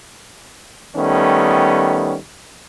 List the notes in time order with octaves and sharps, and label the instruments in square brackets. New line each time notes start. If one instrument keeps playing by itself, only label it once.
[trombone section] D#3 G3 A3 B3 C#4